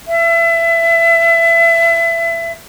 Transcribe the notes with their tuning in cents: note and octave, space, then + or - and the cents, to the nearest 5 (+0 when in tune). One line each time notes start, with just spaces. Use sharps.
E5 +25